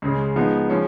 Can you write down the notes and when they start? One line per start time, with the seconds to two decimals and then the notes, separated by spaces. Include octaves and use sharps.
0.02 C#2 C#3 G#3
0.36 F3 G#3 B3 D#4
0.70 F3 G#3 C#4